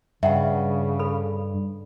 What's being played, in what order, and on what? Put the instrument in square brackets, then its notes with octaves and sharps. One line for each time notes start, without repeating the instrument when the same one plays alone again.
[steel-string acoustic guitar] G2 [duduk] C#3 [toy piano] E5 F#5 G5
[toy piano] A4 B5